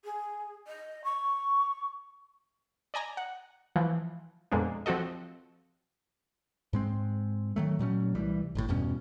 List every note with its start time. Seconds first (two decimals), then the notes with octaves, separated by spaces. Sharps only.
0.04 G#4
0.67 D#5
1.04 C#6
2.94 D5 D#5 G#5 A#5
3.17 F#5
3.76 E3 F3
4.52 F2 A#2 G#3 A#3 B3 D4
4.86 F3 C4 F#4 A4 D#5
6.73 G#2 G#3 C4
7.56 D#3 F#3 A3
7.79 A#2 F#3 A3 C#4
8.15 C2 E3 G3
8.55 G1 F#2 A2
8.69 E2 G2 B2 C#4